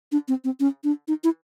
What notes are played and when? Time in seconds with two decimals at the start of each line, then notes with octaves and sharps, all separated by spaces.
0.12 D4
0.28 C4
0.44 C4
0.60 C#4
0.84 D4
1.08 D#4
1.24 E4